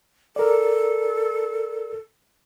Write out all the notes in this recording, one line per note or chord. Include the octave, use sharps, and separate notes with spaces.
A4 A#4 D5